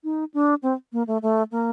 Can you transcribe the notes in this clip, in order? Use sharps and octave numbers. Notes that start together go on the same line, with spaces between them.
D#4
D4
C4
A#3
A3
A3
A#3